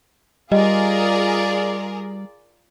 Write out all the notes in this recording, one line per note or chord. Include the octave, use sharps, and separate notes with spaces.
G3 F4 G#4 A#4 D5 D#5